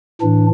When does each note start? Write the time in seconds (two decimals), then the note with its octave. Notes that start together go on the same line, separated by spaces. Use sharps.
0.21 A2 E3 D4